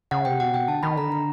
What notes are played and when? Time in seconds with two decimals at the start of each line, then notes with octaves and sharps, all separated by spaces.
0.11 C#3 F#5
0.25 C3 G5
0.40 B2 F#5
0.54 G5
0.68 D3 A5
0.83 D#3 B5
0.97 D3 A#5
1.12 A#5